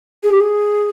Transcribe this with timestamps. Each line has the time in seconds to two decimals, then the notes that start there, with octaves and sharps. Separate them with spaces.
0.24 G#4
0.32 G4
0.40 G#4